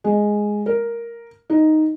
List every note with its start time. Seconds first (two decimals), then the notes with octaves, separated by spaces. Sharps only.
0.04 G#3
0.66 A#4
1.50 D#4